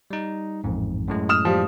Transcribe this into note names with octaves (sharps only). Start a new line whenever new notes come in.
G3 D#4
A1 F2 G#2
F#2 A2 G#3
D#6 F6 E7
F3 G3